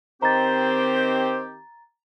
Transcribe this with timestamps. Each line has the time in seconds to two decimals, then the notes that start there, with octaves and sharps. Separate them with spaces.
0.22 D#3 C4 G4 C5 A#5 A6